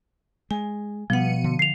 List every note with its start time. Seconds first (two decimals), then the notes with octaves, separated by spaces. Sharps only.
0.51 G#3 G#5
1.10 B2 F3 G3 A3 B3 F#5 C#7 D#7
1.44 D3
1.59 C7 F7